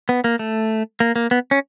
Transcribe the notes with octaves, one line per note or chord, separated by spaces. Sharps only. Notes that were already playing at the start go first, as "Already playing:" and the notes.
B3
A#3
A3
A#3
A#3
B3
C#4